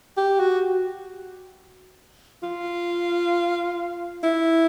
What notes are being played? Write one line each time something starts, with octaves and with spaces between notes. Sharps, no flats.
G4
F#4
F4
E4